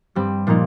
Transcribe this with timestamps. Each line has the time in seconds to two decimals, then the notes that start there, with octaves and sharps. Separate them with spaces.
0.15 G2 G3 C4
0.47 A#2 F3 A#3 D#4